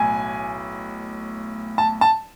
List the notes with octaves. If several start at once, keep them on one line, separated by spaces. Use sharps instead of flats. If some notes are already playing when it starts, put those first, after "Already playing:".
Already playing: B1 A2 G#5
A5
A5